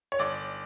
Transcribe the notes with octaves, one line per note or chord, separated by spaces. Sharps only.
C#5
G1 D5